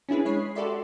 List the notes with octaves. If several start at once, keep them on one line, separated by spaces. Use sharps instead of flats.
C#4 D4 E4 G#4 B4
G#3 C#5 B5 C7
F#4 G4 A4 D5 E5 C6